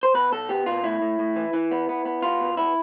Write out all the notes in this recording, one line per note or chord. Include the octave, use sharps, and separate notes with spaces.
C5
B2 B4
B2 A4
B3 G4
B2 F4
A2 E4
A2
A2
E3
E3
B3
B3
B3
B3 F4
B2
B3 E4